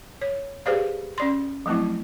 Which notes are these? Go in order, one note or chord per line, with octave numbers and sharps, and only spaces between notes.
C#5
G4 G#4 B4 C5 D5 F5
C#4 D5 C6
F3 F#3 A3 C4 E4